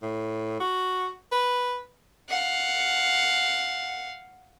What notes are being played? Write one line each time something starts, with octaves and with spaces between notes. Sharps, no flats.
A2
F#4
B4
F5 F#5